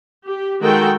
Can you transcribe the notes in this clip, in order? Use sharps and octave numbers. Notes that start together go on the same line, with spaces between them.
G4
D#3 G#3 F#4 A4 G5